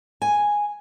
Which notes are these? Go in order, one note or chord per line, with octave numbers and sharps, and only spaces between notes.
G#5